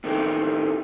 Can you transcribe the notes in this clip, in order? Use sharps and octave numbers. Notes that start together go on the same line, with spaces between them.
A2 D#3 A3 G4